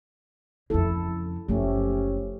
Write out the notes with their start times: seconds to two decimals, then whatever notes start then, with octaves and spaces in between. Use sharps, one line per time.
0.70 F2 C#3 E4 A4
1.48 F#1 F3 A3 C#4 G4